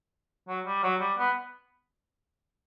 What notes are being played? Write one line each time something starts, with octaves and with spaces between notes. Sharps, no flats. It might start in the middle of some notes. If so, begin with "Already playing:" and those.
F#3
G3
F#3
G3
B3